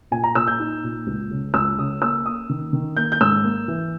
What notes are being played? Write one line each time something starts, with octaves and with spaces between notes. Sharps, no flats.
A#2 G#5
A#5
A#2 E6
G6
D#4
A#2
C#2
C#3
C#2 E6
C#3 D#6
A#3 E6
A#3 D#6
D#3
D#3
A#3 G6
G6
G#2 E6
A#3
E3